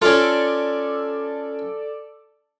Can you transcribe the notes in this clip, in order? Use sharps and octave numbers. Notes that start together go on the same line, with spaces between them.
C#4 F4 A4 D5